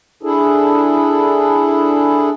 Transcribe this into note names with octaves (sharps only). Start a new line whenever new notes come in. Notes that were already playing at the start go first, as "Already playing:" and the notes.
D4 E4 G#4 A4